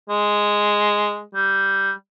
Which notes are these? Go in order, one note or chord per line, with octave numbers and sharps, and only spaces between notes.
G#3
G3